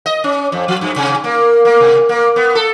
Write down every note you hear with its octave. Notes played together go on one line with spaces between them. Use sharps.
D#5
C#4
F2
F3
G2
C3
A#3
A#3
C3
A#3
B3
A4